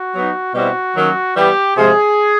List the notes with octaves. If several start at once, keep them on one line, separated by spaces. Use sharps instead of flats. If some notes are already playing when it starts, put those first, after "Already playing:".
Already playing: F#4
F#3 B3 D#4
B2 G3 C4 E4 F#4
D#3 F#3 A#3 C#4
E3 G3 B3 G4
C3 F3 G#3 G#4